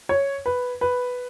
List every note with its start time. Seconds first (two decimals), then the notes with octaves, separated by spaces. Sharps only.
0.09 C#5
0.46 B4
0.81 B4